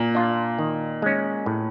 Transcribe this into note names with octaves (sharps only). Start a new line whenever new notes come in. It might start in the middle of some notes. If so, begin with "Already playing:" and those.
Already playing: A#2
D4 F4
D#3
G#3 C#4
A2